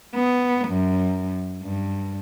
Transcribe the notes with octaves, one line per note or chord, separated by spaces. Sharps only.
B3
F#2
G2